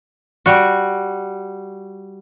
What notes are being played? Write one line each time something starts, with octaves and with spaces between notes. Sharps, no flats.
G3 F#4